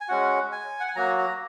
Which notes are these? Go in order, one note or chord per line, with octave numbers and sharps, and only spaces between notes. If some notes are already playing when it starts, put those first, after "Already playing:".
G#5
G#3 C#4 F#4 F#5
G#5
F#5
G#5
F#3 A#3 F#4 A#5
A#5